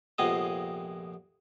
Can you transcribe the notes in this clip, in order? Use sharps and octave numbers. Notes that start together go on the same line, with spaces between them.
A#1 F2 C3 G#3 B3 D#5